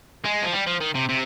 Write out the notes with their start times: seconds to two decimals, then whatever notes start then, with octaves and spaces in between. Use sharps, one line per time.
0.24 G#3
0.42 F3
0.53 G3
0.67 F3
0.80 D#3
0.95 C3
1.09 C3